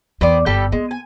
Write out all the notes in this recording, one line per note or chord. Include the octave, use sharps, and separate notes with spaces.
E2 B3 C4 D5
G1 G3 G4 A4
G#3 B3
G#5